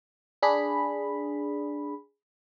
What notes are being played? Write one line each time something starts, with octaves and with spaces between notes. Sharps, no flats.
D4 G#4 B5